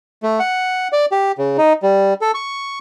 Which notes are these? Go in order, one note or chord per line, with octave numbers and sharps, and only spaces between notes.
A3
F#5
D5
G4
C#3
D#4
G3
A4
C#6